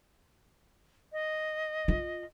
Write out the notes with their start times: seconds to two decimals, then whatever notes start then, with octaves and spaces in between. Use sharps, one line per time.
1.13 D#5
1.88 F4